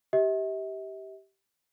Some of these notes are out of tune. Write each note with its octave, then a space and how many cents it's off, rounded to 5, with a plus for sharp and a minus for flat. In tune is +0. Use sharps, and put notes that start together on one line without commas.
G4 -10 E5 -40